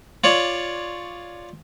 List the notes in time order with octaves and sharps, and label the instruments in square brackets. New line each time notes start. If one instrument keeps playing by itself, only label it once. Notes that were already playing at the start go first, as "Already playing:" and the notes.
[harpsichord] F4 C#5 D5